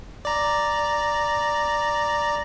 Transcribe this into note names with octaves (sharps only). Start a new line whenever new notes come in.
D5 A#5